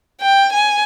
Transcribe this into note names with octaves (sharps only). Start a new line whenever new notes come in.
G5
G#5